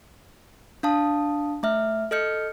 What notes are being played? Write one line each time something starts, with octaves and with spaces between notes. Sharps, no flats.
D4 F5 A5 D#6
A3 E5 F6
A4 D#5 F6 G6 C#7